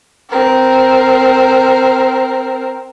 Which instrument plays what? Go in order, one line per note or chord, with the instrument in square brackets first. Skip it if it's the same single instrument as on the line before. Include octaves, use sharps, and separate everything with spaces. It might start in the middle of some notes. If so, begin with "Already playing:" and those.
[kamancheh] C4 A#4